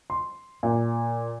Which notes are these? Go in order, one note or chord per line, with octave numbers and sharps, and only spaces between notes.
C6
A#2